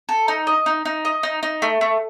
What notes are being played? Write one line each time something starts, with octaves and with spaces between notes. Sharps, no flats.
A4
D#4
D#5
D#4
D#4
D#5
D#4
D#4
A3
A3